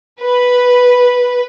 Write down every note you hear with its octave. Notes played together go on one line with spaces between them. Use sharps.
B4